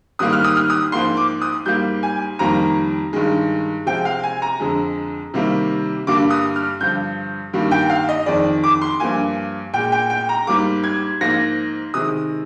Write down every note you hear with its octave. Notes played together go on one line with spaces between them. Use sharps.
G#2 D#3 G3 A#3 D#6
F6
D#6
F6
D#6
G#2 F3 A#3 C6
D6
D#6
G#2 G3 A#3 G6
G#5
F2 D#3 G3 A#3 A#5
G2 D#3 G#3
C3 F3 G#3 G5
F5
G#5
A#5
F2 D3 G#3
C3 D#3 G3 A#3
G2 D3 G3 A#3 D6
D#6
F6
G2 D3 F3 G6
G2 D#3 G3 A#3
G5
F5
D#5
F2 D#3 G#3 D5
D6
C6
G2 F3 A#3 G#5
A#2 G#3 G5
G5
G5
A#5
G#2 G3 A#3 D6
G#6
G#2 F3 A#3 A#6
C3 D#3 G#3 D#6